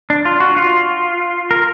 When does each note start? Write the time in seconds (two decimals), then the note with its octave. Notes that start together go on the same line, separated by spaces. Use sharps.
0.10 D4
0.25 F4
0.40 F#4
0.57 F4
1.51 A#4